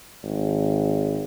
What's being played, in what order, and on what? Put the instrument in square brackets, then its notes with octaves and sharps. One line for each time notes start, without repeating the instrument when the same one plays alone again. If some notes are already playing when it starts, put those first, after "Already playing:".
[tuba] G#1